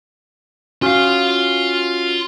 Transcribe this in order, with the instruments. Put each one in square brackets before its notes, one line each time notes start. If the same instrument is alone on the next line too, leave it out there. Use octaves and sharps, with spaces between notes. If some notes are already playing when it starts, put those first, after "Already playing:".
[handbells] C#4 F#4 F6 [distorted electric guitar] F4 F5